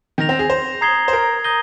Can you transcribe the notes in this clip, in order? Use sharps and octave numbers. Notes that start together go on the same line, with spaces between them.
D#3 G6 A#6 F7
C4
G#4
C5
A#5 D#6 G#6 C7 G7
C5
A#4
D#6 G6 A#6 D#7 G7